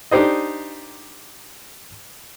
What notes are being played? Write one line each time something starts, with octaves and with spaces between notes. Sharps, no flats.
D4 D#4 G4 C5 D#5